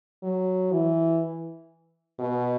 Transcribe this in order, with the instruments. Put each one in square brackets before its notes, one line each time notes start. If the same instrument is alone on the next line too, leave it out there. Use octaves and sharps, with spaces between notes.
[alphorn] F#3
E3
B2